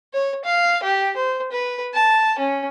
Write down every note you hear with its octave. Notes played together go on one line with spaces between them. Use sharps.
C#5
F5
G4
C5
B4
A5
C#4